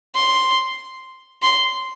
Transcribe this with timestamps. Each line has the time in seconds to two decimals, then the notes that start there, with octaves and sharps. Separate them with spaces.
0.15 C6
1.42 C6